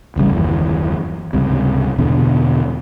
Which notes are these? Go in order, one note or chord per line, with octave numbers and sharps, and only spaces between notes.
D1 A1 C#3 G3
F#1 D#2 E3
C#2 G2 C3
E2 B2 D3